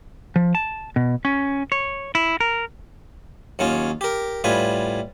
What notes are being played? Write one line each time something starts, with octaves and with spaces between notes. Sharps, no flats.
F3
A5
B2
C#4
C#5
E4
A#4
D#2 F#3 C#4 F4
G4 A#4
A2 G3 F4 B4 G#5